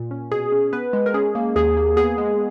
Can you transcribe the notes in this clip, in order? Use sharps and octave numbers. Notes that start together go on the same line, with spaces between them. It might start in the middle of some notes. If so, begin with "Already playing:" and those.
Already playing: A#2
C#4
B2 G#4
C#4
B3 B4
G#3
A#4
C#4 G#4
A#3
D#2 G#4
A#3
B3 G#4
G#3